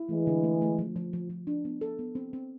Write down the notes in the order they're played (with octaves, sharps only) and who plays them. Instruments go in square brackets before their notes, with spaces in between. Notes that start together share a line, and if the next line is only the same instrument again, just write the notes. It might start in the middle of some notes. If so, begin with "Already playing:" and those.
Already playing: [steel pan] E4
[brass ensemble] E3 G#3 [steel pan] A3
[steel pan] D3
A3
A3
F3
F3
F3
F3
D4
B3
A4
B3
C4
C4